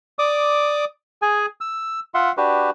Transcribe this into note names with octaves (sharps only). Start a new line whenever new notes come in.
D5 D6 D#6
G#4 G#5
E6
F4 E5 F#5 C6
D4 F#4 G4 B4